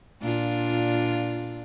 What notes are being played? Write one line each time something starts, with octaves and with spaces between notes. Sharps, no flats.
A#2 D4 F4